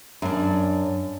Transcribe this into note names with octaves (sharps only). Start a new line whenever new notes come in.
F#2 D4